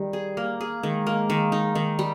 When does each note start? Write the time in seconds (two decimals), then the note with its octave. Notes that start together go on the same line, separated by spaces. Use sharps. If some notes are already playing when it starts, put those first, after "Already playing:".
Already playing: D#3 G3
0.13 G#4
0.37 A#3
0.61 G#4
0.83 D#3 G#3
1.07 A#3
1.30 D#3
1.52 D#4
1.75 D#3
1.99 G3